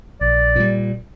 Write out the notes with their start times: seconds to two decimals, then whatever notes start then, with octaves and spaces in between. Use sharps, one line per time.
0.21 A#1 D5
0.56 A#2 G3